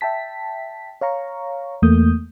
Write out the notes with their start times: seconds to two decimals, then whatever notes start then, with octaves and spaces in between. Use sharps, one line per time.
0.01 E5 G5 A5 B6
1.01 C#5 F5 A#5 C#6
1.82 E2 A3 A#3 D#6 G6